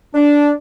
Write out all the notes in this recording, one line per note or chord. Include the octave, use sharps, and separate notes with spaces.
D4